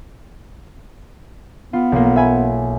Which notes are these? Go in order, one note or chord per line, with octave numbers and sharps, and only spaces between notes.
B3 F4
B1 A#3
E5 G#5 B5